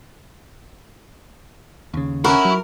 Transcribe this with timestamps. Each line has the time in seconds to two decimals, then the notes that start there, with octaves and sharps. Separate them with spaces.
1.94 D#2 C#3
2.24 C#4 E4 F#4 A#4
2.45 F#3